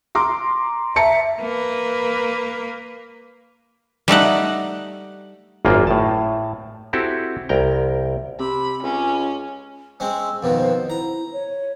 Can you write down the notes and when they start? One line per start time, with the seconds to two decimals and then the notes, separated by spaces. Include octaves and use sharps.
0.15 A#5 C6 D6
0.96 E5 A5 A#5 C#7
1.40 A#3 B4
4.08 G3 A3 D#4 F#5
5.65 G#1 F#2 A#3 F4 G5
5.87 A2 A5
6.93 C4 E4 F#4 G4 A4
7.49 C2 A#4 G5
8.40 C3 B5
8.83 C#2 C#4
10.00 G#3 C4 C#4 E6
10.43 F2 B2 D#3 B4
10.57 C5
10.90 E4 A#5
11.33 C#5